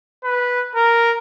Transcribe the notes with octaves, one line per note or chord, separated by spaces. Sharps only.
B4
A#4